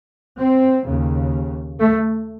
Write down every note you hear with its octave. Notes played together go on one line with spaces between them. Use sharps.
C4
D#2 C#3
A3